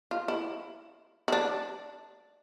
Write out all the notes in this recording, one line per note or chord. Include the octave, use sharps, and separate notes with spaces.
F4
E4
E4
D4